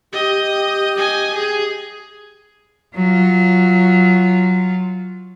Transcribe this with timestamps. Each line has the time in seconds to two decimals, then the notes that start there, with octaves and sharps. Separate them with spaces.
0.13 G4 D#5
0.98 D#5 G#5
1.34 G#4
2.95 F#3 F4